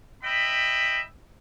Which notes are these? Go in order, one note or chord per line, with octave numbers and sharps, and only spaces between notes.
D#5 E5 G5 B5